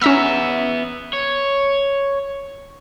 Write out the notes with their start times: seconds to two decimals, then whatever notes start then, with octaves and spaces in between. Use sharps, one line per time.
0.02 B3 C#4 E5 A#5 E6
1.13 C#5